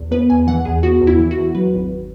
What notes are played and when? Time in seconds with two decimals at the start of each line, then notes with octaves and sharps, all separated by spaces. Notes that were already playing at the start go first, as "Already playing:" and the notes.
Already playing: E2
0.11 B3 B4
0.29 E2 G#5
0.47 E3 F#5
0.65 E2 G#4
0.83 B3 F#4
1.01 E2
1.07 E4
1.19 E3
1.31 F#4
1.37 E2
1.55 F#3 B4
1.73 G#1